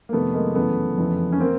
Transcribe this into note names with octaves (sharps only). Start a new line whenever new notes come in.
A#3
F2 C3 D#3 A3 B3
G#3 A#3
F#2 C#3 E3 A3 B3
F2 C#3 E3
C#4
A#3 C4